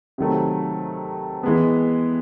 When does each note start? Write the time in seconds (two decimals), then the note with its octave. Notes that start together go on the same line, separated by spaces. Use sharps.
0.18 C3 D#3 F#3 A3
1.43 E3 G#3 B3